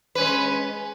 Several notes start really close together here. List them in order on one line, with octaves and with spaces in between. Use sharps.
B4 C#4 G#3